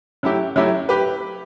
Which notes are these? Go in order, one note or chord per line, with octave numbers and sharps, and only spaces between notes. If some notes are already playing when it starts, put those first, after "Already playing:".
F#3 A3 E4 G4
F#3 A3 E4 G4
G4 B4